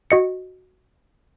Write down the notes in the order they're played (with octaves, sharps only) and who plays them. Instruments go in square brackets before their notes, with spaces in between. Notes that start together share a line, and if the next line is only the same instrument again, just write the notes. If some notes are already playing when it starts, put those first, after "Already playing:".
[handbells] F#4 D#5 C#7